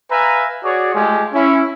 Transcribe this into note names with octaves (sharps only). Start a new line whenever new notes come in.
B4 E5 F5 G#5 A#5
F#4 G#4 C#5 D5
G#3 A3 F4 G4 A4 G#5
C#4 E4